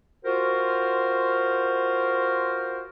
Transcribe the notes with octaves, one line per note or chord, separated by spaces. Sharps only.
F4 F#4 A#4 C5